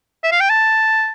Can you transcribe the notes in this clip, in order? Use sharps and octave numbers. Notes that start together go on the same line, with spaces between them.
E5
F5
G5
A5